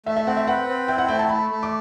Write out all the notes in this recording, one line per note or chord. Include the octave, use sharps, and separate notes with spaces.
A3 E5
E5
C4 F#5
E5
B4 F#5
C4
E4 G5
F#5
A3 G5
A5
A3 B5
A3
D6